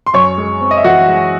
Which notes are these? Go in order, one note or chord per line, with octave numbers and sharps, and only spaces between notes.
C6
F#2 C#5 C#6
G#3
C4
D#5
E5
E3 F#4 F#5
G#3